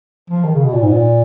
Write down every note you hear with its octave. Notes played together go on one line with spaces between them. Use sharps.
F3
D#3
C#3
B2
A#2
G#2
A#2